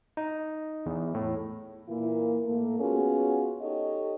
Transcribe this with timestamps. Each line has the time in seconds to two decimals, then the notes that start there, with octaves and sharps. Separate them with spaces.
0.17 D#4
0.86 E2
1.14 A2
1.88 A#2 E3 A#3 E4
2.46 A2 A3 A#3
2.80 B3 C#4 F4 F#4 G#4
3.62 D#4 G4 A4 C#5 D#5